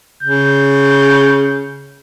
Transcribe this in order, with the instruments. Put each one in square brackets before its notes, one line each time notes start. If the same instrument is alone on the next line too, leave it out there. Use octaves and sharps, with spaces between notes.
[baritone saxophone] C#3 [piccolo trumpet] G6